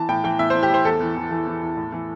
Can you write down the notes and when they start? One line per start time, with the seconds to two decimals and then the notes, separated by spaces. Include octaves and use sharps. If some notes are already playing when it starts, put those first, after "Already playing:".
Already playing: E3 A5
0.09 A2 G5
0.24 E3 G5
0.39 A2 E5
0.50 A2 C5
0.63 G4
0.70 A2 C5
0.85 E2 A4
1.01 E3
1.16 E3
1.31 E3
1.47 E3
1.62 E2
1.77 A2
1.92 E3